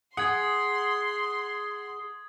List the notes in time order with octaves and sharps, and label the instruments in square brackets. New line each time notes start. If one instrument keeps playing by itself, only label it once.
[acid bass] G#4 [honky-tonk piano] F#5 [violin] C6 [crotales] D#6 G#6